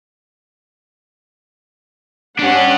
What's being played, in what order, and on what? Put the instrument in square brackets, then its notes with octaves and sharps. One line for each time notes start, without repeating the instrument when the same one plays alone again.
[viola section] C#4 F#5 [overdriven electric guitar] D4 G4